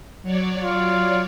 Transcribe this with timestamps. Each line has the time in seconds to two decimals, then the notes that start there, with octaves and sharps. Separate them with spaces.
0.23 F#3 C#5 D5
0.63 F4